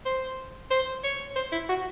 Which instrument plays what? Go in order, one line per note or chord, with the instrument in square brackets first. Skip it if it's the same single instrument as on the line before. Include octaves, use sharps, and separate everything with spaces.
[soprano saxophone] C5
C5
C#5
C5
E4
F#4